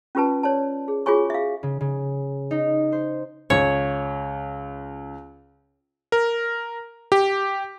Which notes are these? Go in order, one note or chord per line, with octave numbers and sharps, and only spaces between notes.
C#4 F4 G4 B4 A5
C#5 D5 A5
G#4
F4 F#4 G#4 C#5 G#5 C#6
E5 F5
C#3
C#3
D#4
C5
C#2 C#5
A#4
G4